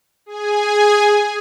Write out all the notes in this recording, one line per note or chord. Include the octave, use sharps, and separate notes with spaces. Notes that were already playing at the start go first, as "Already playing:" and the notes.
G#4 G#5